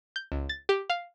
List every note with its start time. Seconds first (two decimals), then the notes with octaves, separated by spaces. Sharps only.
0.16 G6
0.32 C#2
0.49 A6
0.69 G4
0.90 F5